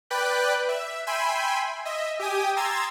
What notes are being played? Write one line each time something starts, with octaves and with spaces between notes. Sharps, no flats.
B4 D5 G5 B5 F#6
E5
E5 G5 G#5 B5 C6
D#5 E5
G4 G5 G#5 D#6
A#5 C6 E6 G#6 A6